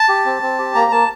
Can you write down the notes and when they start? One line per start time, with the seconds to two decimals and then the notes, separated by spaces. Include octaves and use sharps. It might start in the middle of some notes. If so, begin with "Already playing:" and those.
Already playing: A5
0.09 G4
0.25 C4
0.42 C4
0.59 G4
0.75 A#3 A#5
0.92 A#3 A5